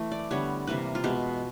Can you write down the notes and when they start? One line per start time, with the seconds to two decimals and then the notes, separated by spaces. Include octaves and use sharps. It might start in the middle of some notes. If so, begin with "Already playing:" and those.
Already playing: E3 A3
0.12 D5
0.31 D3 G3 B3 C#5
0.67 C3 E3 G3 A#3 B4
0.95 F4
1.04 B2 G#3 B3 G4